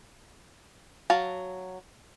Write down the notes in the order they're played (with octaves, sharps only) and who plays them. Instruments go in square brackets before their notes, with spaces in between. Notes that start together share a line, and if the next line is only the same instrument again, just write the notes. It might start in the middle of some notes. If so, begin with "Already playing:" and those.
[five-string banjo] F#3 F5 A5